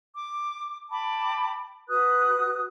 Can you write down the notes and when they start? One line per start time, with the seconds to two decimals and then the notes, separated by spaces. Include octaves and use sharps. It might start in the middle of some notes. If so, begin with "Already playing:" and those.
0.14 D6
0.90 G5 A5 B5 D6
1.89 F#4 B4 D#6 F#6